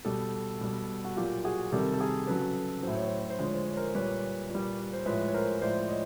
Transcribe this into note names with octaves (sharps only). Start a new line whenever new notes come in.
B2 G3 G4 A4
B2 G3
F#4
A#2 F#3 F4 G4
F#4 G#4
C3 D#3 G3 G4 A4
A4
G#4 A#4
C#3 F#3 A4 B4
A2 F#3 C5
C#5
C5
C#5
C5
D3 F3 G#3 C#5
C5
C#5
A#4 C5
A#2 G3 B4 C#5
A#2 G3
C5
A2 F3 G#3 B4 C#5
C#5
A#4 C5
A2 F3 G#3 C5 D5
C#5 D#5